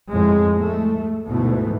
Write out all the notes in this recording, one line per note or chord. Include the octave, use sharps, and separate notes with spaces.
F2 A2 G#3
A3
D2 G#2 B2 E3 A3